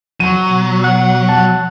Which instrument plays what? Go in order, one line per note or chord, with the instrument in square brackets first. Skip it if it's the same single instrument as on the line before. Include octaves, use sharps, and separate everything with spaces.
[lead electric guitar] F#3 [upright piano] C#6 D#7
[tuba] B2
[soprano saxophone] F#5
[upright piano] A5